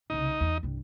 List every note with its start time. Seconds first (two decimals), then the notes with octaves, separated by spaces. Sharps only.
0.10 C2 C#3 D#4
0.40 E2
0.63 C2 G2